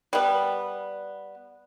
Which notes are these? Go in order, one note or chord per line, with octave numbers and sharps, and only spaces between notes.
G3 B3